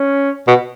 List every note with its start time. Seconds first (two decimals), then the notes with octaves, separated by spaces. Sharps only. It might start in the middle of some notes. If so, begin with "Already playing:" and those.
Already playing: C#4
0.48 B2